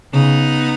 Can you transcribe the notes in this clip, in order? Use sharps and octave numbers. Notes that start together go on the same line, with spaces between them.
C#3 B3 D#4